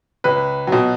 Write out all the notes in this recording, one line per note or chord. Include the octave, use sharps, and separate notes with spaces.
C#2 B4
B2 F#3